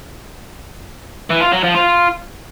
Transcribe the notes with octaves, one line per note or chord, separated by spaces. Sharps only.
E3
F4
F#3
F3
F4